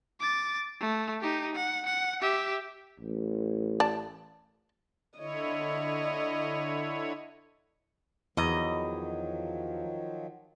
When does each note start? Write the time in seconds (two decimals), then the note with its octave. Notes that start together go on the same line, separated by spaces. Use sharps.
0.20 D6 A6
0.80 A3
1.21 D#4 G4
1.55 F#5
1.86 F#5
2.21 G4 E5
3.00 A1
3.80 D5 A5
5.19 D3 E4 C#5 D#5
8.37 E2 D#3 F3 F#3 D#5 A#5